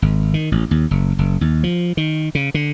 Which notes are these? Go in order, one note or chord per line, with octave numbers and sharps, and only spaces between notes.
G#1
D#3
A1
D#2
F#1
F#1
D#2
F3
D#3
C#3
D3